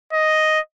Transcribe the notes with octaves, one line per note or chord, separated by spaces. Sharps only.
D#5